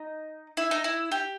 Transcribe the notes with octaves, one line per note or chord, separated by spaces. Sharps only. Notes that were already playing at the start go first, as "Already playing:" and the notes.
Already playing: D#4
E4
D#4
E4
G4